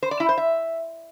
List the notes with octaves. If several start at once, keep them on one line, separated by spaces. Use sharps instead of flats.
C5
D5
E4
C5
E5